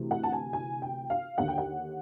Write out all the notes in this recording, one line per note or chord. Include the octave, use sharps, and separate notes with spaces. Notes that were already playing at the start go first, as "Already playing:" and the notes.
Already playing: D2 C3 E3
F#5
A5
G#5
G#5
G5
F5
D#2 D3 F#5
G5
F#5